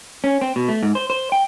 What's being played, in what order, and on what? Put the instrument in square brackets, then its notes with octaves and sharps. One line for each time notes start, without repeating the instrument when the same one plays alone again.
[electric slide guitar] C#4
C4
B2
A3
G#2
C5
C5
G5